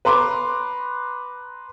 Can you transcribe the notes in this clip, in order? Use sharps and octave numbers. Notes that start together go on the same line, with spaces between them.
B4 A#5 C6 D6